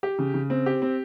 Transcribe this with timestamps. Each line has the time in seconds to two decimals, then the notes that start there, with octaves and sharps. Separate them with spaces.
0.03 G4
0.19 C#3
0.34 C#3
0.50 C4
0.66 G4
0.82 C4